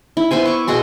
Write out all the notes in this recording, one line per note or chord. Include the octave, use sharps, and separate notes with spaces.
E4
B3 E4 C5 G#5
C#6 D6
B2 F#4 G#4 C6